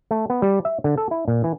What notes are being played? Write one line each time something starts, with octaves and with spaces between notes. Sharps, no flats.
A3
B3
G3
E5
D3
A4
E4
A#2
E3